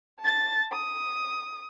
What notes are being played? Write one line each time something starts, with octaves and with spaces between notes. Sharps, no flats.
A5 A6
D#6